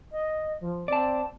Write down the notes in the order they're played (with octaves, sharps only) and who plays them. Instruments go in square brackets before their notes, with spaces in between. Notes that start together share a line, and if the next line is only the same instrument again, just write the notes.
[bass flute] D#5
F3
[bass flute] C4 [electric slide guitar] D5 A5